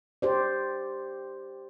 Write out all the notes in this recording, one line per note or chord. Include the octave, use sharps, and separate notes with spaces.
G4 C5 D5